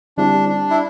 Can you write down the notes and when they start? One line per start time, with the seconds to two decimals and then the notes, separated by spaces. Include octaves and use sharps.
0.17 D3 G3 C4 D4 E4 G4
0.49 D4
0.70 E4